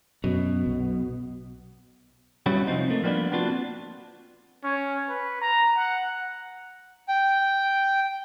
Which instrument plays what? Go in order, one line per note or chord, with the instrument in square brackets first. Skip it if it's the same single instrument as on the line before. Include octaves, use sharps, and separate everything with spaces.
[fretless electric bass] F#2 [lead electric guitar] B2
[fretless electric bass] B1
[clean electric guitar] G3 B3 C#4 E4 F#4
C3 F3 C4 D#4
A3 A#3
F3 G3 A#3 B3 D4
B3 C4 D4 F4 F#4
[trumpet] C#4
B4
A#5
F#5
[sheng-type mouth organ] G5